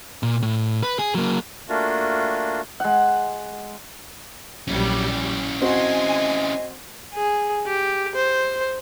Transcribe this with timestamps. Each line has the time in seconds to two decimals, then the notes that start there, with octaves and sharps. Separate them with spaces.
0.23 A#2
0.42 A2
0.83 B4
0.99 G#4
1.15 F#3 A#3
1.69 A3 A#3 D4 F4 F#4
2.80 G#3 F#5
4.68 A#1 F#3 G3 C#4 E4
5.62 C4 F#4 D#5 G#5 C6
7.14 G#4
7.66 G4
8.15 C5